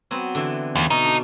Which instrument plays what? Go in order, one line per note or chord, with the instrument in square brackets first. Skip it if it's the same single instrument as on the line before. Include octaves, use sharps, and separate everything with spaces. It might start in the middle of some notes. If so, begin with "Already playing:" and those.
[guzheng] F#3 B3 C4
D3 E3
[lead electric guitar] D#2
[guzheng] B2 [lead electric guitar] D#4
[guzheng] D4